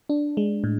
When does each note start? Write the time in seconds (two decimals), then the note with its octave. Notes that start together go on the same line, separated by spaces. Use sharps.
0.09 D4
0.37 G#3
0.64 A2